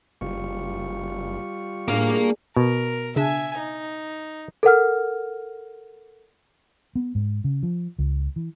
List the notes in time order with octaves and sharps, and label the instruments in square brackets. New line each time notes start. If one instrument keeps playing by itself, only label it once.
[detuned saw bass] F#1 [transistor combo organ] G3 F4 C#6
[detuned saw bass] A2 [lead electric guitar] A#3 F5 [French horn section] D4 G#4
[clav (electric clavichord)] B2 [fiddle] A#4
[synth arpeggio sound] C#3 D4 [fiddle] E5 G#5
[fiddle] D#4
[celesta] A4 A#4 F#5 F6
[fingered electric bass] B3
G#2
C#3
F3
C#2
E3